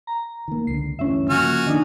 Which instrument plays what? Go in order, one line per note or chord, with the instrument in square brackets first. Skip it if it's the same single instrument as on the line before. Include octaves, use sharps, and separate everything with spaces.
[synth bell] A#5
[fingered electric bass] D#3 A#3
[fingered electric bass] C#2 D3 [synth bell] C7
[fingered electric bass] D2 G2 E3 [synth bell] C#4 E5
[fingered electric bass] C#3 F3 A#3 [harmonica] F#4 G#5 F6
[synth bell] D#3 D4 D#4